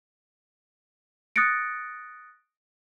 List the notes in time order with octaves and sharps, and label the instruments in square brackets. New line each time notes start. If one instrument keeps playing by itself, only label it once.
[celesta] D#6 F#6 A6 A#6 C#7 D7